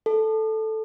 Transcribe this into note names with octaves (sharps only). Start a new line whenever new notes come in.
A4